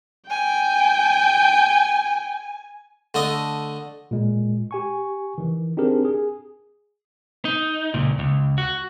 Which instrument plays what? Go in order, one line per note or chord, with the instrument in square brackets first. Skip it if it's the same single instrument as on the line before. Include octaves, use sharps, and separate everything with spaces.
[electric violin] G5 [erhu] G#5
[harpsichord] D3 A3 D#5
[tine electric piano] A#2 G#3
G4 G#5 C#6
D#3 E3
C4 D4 D#4 G4 G#4 A#4
G#4
[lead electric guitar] D#4
C#2 A#2
C#2
F#4